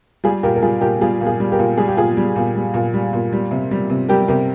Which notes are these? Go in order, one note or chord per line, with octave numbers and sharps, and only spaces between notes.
G3 F4 G#4
A#2 G4 A#4
A#4
G3 F4 G#4
A#2 G4 A#4
G3 F4 G#4
A#2
F4 G#4
G3
G4 A#4
A#2
G3 G#4
G4
A#2 F4 G#4
G3
A#2
G3
A#2
G3
A#2
G3
C3
G3
C3
G3 G4 A#4
C3 G4 A#4